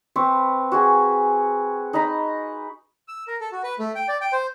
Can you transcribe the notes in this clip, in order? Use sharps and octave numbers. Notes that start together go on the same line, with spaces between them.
C4 B4 C#6
F#4 G#4 G#5
D#4 D#5 A#5 B5
E6
A#4
A4
F#4
B4
A3
G5
D5
G5
C5